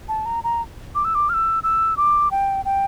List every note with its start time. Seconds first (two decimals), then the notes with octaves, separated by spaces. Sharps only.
0.09 A5
0.26 A#5
0.44 A#5
0.95 D6
1.05 E6
1.15 D6
1.29 F6
1.34 E6
1.63 E6
1.97 D6
2.31 G5
2.65 G5